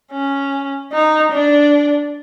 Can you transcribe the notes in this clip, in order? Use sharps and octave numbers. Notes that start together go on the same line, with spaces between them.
C#4
D#4
D4